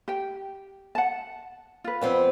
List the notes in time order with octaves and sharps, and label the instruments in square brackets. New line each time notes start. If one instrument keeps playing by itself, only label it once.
[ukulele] G4 G5
F#5 A5
F4 B4
[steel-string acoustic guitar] F2 B3 C4